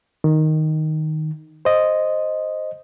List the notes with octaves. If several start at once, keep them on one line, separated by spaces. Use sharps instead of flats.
D#3
C5 D#5